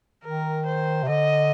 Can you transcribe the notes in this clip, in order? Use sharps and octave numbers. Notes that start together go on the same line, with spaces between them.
D#3 A#4
C5
C3
D3 D#5